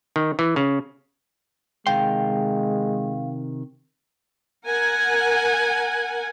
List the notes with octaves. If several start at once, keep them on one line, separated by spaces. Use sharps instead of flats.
D#3
E3
C#3
C3 D#3 G#3 F5 G5 C6
A#4 F#5 G#5